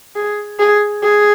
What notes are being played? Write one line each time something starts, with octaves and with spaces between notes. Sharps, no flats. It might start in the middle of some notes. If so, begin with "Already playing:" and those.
G#4
G#4
G#4